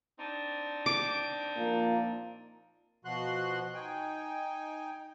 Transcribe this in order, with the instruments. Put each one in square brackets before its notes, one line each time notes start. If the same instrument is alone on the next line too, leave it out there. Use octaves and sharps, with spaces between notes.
[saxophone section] C4 D4 D#4
[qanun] D6
[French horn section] A#2 F3 A#3
[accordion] B2 F3 F#4 C6 F#6
D#4 G5 G#5